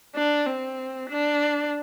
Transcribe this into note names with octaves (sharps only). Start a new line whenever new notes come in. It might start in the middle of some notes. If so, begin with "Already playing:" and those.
D4
C4
D4